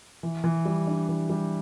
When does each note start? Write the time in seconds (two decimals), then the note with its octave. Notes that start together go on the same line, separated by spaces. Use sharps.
0.23 E3
0.44 E3
0.65 G3
0.87 D4
1.09 E3
1.30 G3